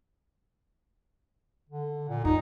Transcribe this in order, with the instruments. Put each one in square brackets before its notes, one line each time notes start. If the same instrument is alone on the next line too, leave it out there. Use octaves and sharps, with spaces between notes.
[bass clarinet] D3
A#2
[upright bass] F#2 [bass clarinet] D#4